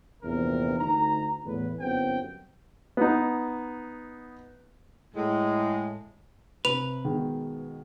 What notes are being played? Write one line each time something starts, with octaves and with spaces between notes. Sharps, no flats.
A#1 E2 G2 C3 A#4
D2 D#4 A#5
E2 A2 B4
G1 F#2 B3 C4 G5
B3 D#4
A2 G#3
C3 B4 F7
B2 D#3 G#3